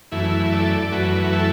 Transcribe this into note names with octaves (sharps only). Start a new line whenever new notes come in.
F#2 E3 A3 E4
A4 D5
F#2 E3 A3 F#4 B4
E4 A4